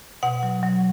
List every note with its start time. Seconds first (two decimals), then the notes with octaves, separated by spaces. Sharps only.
0.23 B2 F#5
0.43 F#3
0.63 F#3